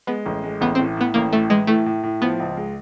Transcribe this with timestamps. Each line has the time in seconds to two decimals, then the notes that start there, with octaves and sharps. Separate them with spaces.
0.07 G#3 B3
0.26 A1
0.43 G#3
0.61 A1 B3
0.75 A2 C4
0.97 A2 B3
1.14 A1 A#3
1.32 A2 A3
1.50 E3 G#3
1.67 A2 A3
1.86 A2
2.03 A2
2.21 F3 B3
2.40 C#2
2.57 G#3